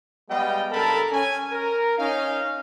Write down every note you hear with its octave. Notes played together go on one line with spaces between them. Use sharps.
G3 G#3 B3 D#5 F5 G5
G2 C#3 A4 A#4 A5 B5
C#4 G#5
A#4
C#4 D#4 F5